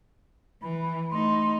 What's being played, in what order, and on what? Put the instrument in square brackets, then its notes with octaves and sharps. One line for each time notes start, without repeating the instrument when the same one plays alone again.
[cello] E3 [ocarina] B5
[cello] A3 D#4 [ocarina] C6